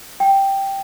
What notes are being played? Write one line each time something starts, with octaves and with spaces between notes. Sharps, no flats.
G5